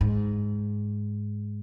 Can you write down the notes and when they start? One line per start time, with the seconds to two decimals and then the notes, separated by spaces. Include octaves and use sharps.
0.01 G#2